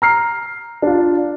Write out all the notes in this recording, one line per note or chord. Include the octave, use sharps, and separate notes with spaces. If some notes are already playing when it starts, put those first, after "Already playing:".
A#5 F6 C7
D4 F4